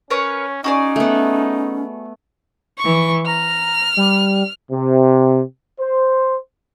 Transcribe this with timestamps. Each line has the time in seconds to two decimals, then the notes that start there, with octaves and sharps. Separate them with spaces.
0.10 C#4 A#4 B4 C#5
0.64 C#4 D#4 F#4 G#4 D5
0.96 A3 B3
2.80 E3 C#6
3.27 A#5 F6
3.97 G3
4.71 C3
5.80 C5